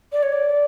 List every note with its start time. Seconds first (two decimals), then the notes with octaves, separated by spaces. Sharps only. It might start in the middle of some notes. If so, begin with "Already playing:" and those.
0.12 D5
0.23 C#5
0.32 D5